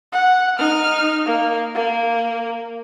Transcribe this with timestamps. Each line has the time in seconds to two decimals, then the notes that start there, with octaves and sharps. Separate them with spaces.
0.12 F#5
0.58 D#4 F6
1.26 A#3
1.75 A#3